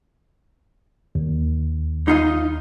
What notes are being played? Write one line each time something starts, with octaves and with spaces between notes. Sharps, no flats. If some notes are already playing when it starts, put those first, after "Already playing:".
D#2
D#4 F4 D#5